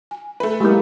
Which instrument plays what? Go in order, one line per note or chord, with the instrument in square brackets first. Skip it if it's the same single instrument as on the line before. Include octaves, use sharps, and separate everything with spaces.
[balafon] G#5
[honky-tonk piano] A3 B4
[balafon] F#3 E4 G4 [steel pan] G#3 A#3